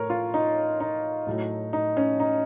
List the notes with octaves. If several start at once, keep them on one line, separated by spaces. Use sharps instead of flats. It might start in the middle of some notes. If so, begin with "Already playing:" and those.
Already playing: A2 A3 A#4 C#5
F4
D#4
D#4
A2 F#3 A3
D#4
C#4
D#4